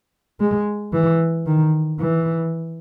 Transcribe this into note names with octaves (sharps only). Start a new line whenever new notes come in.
G#3
E3
D#3
E3